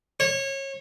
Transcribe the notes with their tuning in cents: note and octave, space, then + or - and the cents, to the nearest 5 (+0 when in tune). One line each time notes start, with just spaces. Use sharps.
C#5 -25